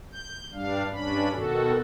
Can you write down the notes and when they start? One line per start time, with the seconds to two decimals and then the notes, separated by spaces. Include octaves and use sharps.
0.12 G6
0.53 G2 G3 D4 F5
0.92 G2 C#4 D4 B5
1.32 B2 D#3 F#4 A4